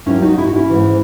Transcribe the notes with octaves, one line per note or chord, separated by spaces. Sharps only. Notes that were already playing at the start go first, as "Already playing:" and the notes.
D#2 D#3 F#3 C#4 E4
D#4 F#4
E4
F#4
C#4 E4
G#2 E3